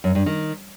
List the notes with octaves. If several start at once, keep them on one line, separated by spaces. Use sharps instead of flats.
F#2
G2
D#3